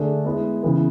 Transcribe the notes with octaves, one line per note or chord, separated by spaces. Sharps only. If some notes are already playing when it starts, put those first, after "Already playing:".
Already playing: D3 A3 D4 G#4
G#3 B3 E4
C#3 E3 B3